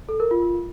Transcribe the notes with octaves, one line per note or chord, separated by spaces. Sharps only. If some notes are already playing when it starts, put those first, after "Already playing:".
A4
A#4
F4